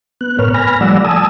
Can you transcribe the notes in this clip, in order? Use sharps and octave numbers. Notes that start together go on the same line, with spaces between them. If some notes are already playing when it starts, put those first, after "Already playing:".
B3 F#6
A2 A#4 B4 C#5 F6
G#5 B5 F6 A#6
F3 G3 A3 D5 F#5 E6
G#5 A5 D#6 E6